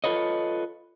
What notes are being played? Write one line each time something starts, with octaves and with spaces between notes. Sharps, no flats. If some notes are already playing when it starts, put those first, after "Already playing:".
F4 A4 B4 C#5 D#5